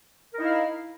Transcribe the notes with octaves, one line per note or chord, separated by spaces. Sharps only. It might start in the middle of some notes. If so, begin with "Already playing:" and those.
D#4 E4 A#4 F5